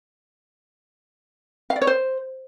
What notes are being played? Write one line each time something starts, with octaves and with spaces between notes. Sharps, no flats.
F5
D5
C#5
C5